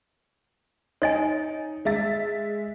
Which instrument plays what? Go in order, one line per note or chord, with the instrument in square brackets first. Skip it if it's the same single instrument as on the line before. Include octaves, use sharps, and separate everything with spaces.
[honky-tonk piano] D#4 [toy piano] C#5 D#5 G#5
[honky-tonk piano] G#3 E5 A6